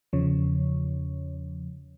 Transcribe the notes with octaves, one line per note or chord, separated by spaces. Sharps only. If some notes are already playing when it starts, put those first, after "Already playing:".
E2 C#3 F3 C#5